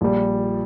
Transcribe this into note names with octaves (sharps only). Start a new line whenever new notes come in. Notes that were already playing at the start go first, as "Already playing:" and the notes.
A#1 A#2 G3